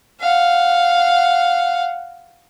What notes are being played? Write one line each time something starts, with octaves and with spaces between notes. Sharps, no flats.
F5 F#5